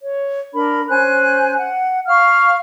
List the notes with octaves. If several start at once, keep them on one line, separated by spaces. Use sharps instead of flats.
C#5
D4 A#4 B5
C#4 C5 G#5 F#6
F#5
F5 C#6 F6